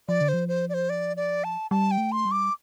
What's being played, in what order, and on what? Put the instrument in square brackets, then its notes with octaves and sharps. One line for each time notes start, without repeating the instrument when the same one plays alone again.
[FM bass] F3 [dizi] D5
[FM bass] D3
[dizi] C5
[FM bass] F3
[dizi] C5
D5
C5
D5
D5
A5
[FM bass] G3 [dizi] A5
[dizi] G5
[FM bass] A3
[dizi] C6
[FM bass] G3
[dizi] D6